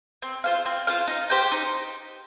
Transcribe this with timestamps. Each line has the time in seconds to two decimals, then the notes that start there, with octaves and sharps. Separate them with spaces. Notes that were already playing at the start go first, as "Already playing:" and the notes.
0.22 C4
0.44 F4 C5 F5
0.66 C4
0.87 F4 C5 F5
1.08 D#4
1.30 G4 C5 G5
1.52 D#4